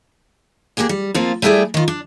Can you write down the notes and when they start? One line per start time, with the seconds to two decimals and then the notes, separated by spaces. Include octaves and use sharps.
0.77 A#3 C#4 D4 G4 G#4
0.89 G3
1.14 F3 A#3 C4 F4
1.42 G3 A3 B3 E4 G#4 D5
1.74 D#3 F4
1.88 D4